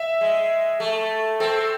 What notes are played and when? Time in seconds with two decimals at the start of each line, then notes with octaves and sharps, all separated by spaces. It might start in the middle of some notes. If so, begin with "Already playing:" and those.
Already playing: E5
0.21 G#3
0.80 A3
1.40 C4 A4